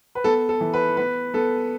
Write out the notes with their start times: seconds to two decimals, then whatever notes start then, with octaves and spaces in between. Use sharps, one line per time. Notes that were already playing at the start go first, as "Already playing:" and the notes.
0.15 B4
0.24 B3 A4
0.49 A4
0.61 E3
0.74 B4
0.97 B3 B4
1.34 B3 A4